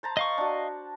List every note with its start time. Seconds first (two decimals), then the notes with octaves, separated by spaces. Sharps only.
0.03 C5 A5 A#5
0.17 D#5 F5 C#6
0.38 D4 F#4